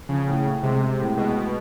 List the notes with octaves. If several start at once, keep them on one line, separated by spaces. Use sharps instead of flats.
C#3 F3
A2
A2
C3 G#3
G#3
A2
B2 G#3
G#3